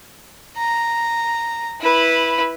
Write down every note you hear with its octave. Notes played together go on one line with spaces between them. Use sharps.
A#5
E4 B4